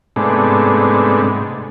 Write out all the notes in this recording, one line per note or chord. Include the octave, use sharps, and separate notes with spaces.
G#2 C3 G#3 A3 B3 D4